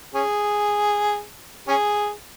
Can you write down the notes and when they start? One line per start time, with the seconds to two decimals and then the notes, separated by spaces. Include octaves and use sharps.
0.14 C#4 G#4
1.68 C#4 G#4